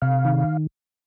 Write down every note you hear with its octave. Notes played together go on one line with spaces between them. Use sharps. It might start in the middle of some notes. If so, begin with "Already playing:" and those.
C3 F5
D#3